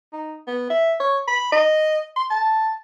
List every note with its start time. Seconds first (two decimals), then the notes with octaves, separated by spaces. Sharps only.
0.13 D#4
0.47 B3
0.70 E5
1.00 C#5
1.27 B5
1.52 D#5
2.16 C6
2.30 A5